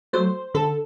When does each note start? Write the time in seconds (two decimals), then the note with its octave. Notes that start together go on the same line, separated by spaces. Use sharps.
0.13 F#3 A3 C5
0.54 D3 A4